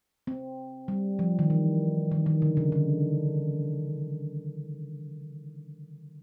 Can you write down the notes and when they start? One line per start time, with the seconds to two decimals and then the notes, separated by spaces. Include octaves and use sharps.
0.27 C4
0.88 G3
1.19 F3
1.39 D#3
1.50 E3
2.12 D#3
2.26 D#3
2.42 D3
2.57 C#3
2.72 D3